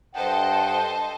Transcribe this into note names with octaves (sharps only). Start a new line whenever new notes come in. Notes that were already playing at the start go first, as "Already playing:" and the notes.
G2 A4 C5 D#5 F#5 G5